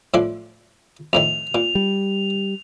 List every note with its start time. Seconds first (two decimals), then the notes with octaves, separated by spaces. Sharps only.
0.14 A2 F3 D4
1.13 F2 A2 D#3 F7
1.55 A#2
1.75 G3